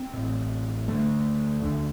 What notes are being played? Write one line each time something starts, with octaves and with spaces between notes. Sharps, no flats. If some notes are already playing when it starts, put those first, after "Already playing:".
Already playing: C4
A1 A2
D2 D3 A3
D2 D3